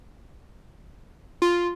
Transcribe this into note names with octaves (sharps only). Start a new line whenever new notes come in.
F4